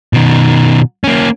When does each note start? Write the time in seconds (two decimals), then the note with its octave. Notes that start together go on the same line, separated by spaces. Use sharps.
0.13 B2 D#3
1.04 A#3 C#4